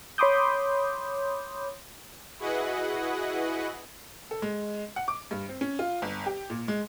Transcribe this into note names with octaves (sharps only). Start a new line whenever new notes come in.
C#5 B5 C6 D6 D#6 G6
E4 F#4 G#4 B4 D#5 F#5
A4
G#3
F#5
D6
G2
C4
C#4
F4
G1
G4
A#2
G#3